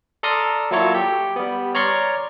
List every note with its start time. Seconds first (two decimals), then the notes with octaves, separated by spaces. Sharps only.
0.23 A4 D5 A#5 C6 D#6 F6
0.71 F#3 A#3 E4 F4 A4 C#5
0.94 G4
1.36 G3 B3
1.75 C#5 D5 A#5 C6 C#6 F6